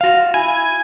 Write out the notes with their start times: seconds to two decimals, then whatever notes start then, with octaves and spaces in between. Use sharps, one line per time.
0.01 F#4 F5
0.34 E4 G#5